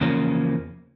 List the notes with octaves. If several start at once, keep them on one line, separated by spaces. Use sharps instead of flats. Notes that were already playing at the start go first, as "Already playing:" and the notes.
E2 C#3 F3 A#3 C#4